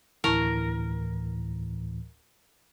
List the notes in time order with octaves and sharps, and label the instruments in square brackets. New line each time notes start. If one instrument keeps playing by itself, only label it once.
[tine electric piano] D2 A2 E3 [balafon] E4 A5 C#6 [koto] A#4